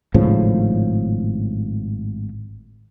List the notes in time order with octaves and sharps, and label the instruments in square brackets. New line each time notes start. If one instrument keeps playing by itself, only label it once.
[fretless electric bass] G#1 A2 C#3 F3